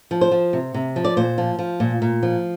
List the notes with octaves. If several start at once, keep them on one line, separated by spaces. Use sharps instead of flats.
F3
C5
F3
C3
C3
F3
D5
A#2 C5
F3
F3
A#2
A#2
F3